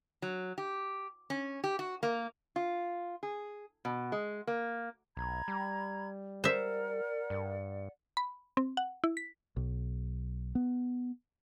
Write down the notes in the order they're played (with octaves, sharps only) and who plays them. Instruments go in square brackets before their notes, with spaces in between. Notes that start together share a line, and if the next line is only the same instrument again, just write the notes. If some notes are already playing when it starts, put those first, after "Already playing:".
[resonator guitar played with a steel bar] F#3
G4
C#4
G4
F#4
A#3
F4
G#4
B2
G#3
A#3
[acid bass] B1 [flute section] A#5 B5 G#6
[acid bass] G3
[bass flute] A#4 [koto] C5 E5 [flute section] D5 F#5
[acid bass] G2
[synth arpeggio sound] B5
C4
F#5
E4
B6
[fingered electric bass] B1
B3